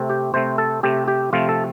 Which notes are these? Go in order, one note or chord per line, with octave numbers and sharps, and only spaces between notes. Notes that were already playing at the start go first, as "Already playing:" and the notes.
Already playing: C3 A3 C4
G4
C3 A3 C4 C5
A4
C3 A3 C4 G4
G4
C3 F3 A3 C4 F4
A4